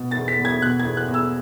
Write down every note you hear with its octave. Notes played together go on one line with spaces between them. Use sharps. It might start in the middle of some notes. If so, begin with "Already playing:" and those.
Already playing: B2
A6
E2
B6
E2
G#6
B2 F#6
G#6
E2
F#6
E2
E6